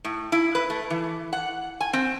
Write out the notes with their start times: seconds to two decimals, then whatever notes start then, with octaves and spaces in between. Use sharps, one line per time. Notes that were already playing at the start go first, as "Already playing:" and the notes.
0.04 A2
0.32 E4
0.55 B4
0.70 A3
0.90 E3
1.33 F#5
1.80 G#5
1.93 C4